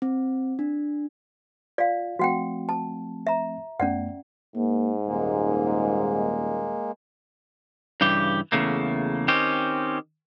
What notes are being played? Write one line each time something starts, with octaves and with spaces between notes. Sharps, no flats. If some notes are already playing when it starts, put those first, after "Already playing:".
C4
D4
F4 D5 F5
F3 A3 C4 F#4 F#5 G5
A5
E5 A#5
F#2 A3 B3 C#4 D5 F#5
G#2 A#3
D#1 G#3 A#3
G2 C#3 E3 G4
E2 C#3 A3 A#3
D#3 C4 C#4 G4